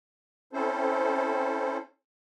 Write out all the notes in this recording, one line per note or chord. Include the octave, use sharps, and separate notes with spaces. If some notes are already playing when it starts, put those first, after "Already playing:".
C4 C#4 E4 A4 C5